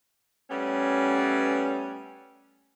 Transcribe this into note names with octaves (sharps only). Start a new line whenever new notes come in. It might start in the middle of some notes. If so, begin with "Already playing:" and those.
G3 A3 B3 C#4